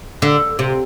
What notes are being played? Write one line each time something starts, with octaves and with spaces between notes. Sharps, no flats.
D3
C3